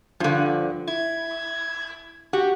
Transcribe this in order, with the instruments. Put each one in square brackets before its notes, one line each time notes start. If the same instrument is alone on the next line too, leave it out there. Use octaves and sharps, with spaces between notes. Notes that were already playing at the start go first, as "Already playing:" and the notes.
[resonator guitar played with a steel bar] G2 D3 [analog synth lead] F3
[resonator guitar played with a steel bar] E4 [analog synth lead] G#6
[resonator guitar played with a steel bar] F#4 [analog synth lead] G4